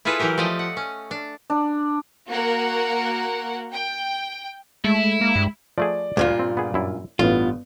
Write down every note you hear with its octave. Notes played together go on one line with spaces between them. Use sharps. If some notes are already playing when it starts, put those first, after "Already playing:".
E4 F4 G#4 A4 B4
E3 F#3 G4 A#4
F3 A3 D5 D#5 G5
F#5
C#4
D4
D4
A#3 F#4 A#4 F#5
G5
G#3 A3 E4
A#3
G2
F3 A3 G#4 D5
D2 G2 A#2 F4
C4
B3 G#4
F#2 E4
A1 G2 B3 F4